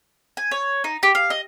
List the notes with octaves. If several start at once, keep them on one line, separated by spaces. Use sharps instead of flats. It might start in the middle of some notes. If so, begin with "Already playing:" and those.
G#5
C#5
D#4
G4
F5
D#5